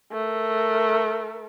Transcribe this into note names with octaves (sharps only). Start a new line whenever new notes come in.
A3 A#4